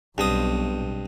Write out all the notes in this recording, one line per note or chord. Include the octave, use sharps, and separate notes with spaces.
B1 G2 B2 C4 D#6